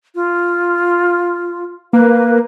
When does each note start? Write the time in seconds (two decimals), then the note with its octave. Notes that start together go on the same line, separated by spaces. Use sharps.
0.15 F4
1.93 A#3 B4